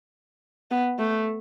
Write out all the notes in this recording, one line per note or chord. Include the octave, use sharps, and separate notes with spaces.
B3
A3